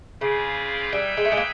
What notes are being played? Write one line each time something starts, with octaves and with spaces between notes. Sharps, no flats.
C#3 C4 F4 G#4 B4 D5
G3 D#4 G#4 B4 E5 G5
G#3
A3
G#3
A#3